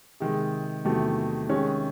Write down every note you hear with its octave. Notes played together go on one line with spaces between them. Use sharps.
C3 D#3 G#3
E2 C3 D#3 F#3 A3
C3 D#3 G#3 C#4